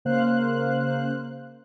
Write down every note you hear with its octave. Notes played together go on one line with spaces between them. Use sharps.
C#3 A#3 C5 F5 F#6